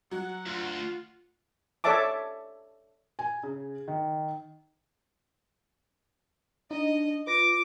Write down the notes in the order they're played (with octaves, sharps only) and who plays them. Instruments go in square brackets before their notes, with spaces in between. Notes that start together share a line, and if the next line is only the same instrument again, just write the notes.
[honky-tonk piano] F#3 F#4 [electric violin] F#5
[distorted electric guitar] D2 [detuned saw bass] F4
[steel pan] A4 C#5 D5 E5 A5 D6
[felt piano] G#5
C#3
D#3
[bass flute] D4 [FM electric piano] D#4 [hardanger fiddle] D#5
[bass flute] F4 [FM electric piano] B4 A#6 [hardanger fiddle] D6